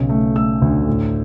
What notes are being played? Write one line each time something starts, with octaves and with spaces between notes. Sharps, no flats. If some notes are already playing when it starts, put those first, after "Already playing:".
Already playing: B1 C#3
A3
A3 E6
D2
A2